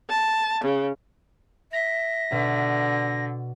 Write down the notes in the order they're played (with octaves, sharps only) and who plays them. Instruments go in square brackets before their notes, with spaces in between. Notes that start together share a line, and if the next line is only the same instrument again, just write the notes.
[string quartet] A5
C#3
[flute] E5 [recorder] A#6
[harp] B2 [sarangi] D3